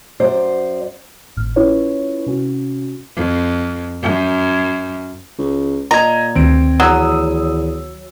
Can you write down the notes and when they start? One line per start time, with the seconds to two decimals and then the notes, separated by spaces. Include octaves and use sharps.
0.20 F#2 C5 D5
1.37 G#1 A2 F6
1.56 C#4 E4 F4 B4 C#5
2.26 C3 C#4 F#4
3.16 F2
4.02 F#2
5.39 C#2
5.91 A#2 D#5 A#5 G#6
6.35 D2 D#3 C4 D7
6.80 E2 F#3 D#6 E6